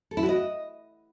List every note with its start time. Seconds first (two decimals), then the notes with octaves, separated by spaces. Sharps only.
0.11 A4
0.17 E4
0.23 F#4
0.29 D#5